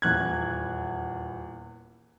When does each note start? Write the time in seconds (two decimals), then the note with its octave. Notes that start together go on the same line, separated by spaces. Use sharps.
0.02 D#1 E2 F#6 G#6